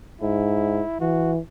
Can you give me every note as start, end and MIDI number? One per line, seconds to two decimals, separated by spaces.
0.21 0.82 44
0.21 0.96 64
1.00 1.39 52
1.00 1.32 66